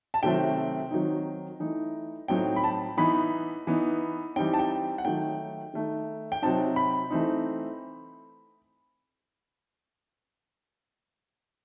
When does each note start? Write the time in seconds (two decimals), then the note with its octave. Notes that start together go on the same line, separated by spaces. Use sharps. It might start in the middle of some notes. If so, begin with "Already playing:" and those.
0.14 A5
0.23 C3 D#3 F#3 A3 C4 G5
0.91 D#3 F#3 C4 D#4
1.60 E3 A3 D#4
2.28 A2 F#3 C4 D#4 G5
2.56 B5
2.64 A5
2.97 E3 B3 D#4 B5
3.67 E3 B3 D#4
4.36 E3 G3 C4 D#4 G5
4.53 A5
4.59 G5
4.98 F#5
5.05 D#3 F#3 A3 D#4 G5
5.74 D#3 A3 D#4
6.32 G5
6.42 C3 F#3 C4 D#4 A5
6.76 B5
7.11 E3 A3 C4 D#4